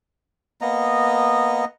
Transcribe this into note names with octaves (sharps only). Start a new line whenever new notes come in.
A#3 B3 D#5 A#5